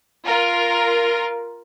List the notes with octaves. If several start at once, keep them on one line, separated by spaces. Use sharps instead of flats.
F4 A#4